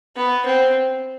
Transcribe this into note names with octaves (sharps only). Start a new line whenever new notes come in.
B3
C4